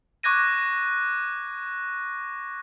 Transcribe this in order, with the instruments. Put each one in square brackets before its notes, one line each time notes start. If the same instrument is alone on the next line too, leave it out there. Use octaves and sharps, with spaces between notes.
[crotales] C#6 D6 F#6 G#6 A#6 D#7